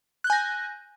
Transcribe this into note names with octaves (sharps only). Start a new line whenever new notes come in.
G#5 F#6 G6 A#6